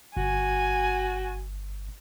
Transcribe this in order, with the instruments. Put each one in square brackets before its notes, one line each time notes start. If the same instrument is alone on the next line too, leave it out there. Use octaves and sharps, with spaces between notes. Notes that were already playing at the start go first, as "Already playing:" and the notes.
[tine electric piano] G1 [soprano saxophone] F#4 [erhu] G#5